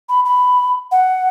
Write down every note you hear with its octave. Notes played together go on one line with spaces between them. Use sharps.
B5
B5
F#5